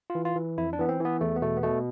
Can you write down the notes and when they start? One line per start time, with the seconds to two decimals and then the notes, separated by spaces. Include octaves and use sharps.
0.10 F4
0.15 E3
0.25 F4
0.36 E3
0.58 F2 E4
0.73 D4
0.78 E3 B3
0.89 C4
1.00 E3 B3
1.21 E2 A3
1.36 B3
1.42 B2 A3
1.57 B3
1.63 B2 A3